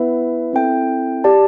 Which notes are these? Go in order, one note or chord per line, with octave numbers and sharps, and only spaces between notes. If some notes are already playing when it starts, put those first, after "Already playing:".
Already playing: B3 E4 B4 E5
C4 E4 A4 E5 G5
G4 D5 A5